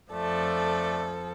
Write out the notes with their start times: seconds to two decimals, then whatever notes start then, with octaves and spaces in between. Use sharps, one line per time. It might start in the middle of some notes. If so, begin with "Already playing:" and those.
0.11 F2 F3 A3 A4 D5